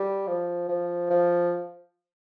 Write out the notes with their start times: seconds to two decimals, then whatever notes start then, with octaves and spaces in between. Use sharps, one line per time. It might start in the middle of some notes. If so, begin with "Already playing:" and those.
Already playing: G3
0.28 F3
0.69 F3
1.10 F3